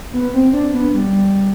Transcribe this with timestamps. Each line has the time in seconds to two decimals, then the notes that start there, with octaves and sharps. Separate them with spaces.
0.13 B3
0.34 C4
0.53 D4
0.74 B3
0.94 G3